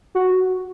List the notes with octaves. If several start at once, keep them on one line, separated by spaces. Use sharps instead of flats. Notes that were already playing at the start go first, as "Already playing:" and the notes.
F#4